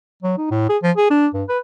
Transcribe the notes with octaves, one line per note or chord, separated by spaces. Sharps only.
F#3
D#4
A2
G#4
F3
G#4
D4
G2
B4